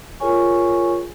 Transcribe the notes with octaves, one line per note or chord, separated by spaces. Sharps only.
F4 G#4 A#4 C#5 G#5 C#6